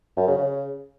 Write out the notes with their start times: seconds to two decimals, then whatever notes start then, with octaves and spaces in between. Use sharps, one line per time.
0.17 F#2
0.28 C#3
0.38 C#3